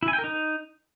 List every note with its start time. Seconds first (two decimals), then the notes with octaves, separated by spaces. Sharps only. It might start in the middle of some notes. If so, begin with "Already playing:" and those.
0.03 E4
0.08 G#5
0.13 G5
0.19 A#4
0.24 D#4